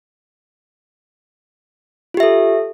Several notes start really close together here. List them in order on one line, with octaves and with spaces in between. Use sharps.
F4 G4 E5 A4